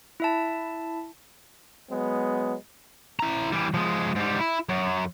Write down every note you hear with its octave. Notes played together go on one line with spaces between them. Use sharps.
E4 E5 A5
F#3 G#3 B3
E4 A#5
E3 G3
F3 G#3
G#2 G3
E4
F#2